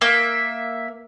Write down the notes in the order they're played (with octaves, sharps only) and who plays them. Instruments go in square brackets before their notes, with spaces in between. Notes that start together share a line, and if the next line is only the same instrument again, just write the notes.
[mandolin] A#3 E5